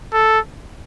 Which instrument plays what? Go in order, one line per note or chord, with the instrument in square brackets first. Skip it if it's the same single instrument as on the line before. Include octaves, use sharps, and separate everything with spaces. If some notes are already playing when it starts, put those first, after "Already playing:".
[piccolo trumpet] A4